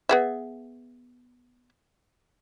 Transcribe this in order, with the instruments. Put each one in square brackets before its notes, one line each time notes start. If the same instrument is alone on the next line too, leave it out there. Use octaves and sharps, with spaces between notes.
[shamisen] B3 G#4 E5